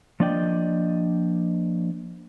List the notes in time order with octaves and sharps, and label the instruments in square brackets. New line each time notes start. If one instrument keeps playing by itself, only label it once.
[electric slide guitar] F3 A#3 D4 D5 D#5 G5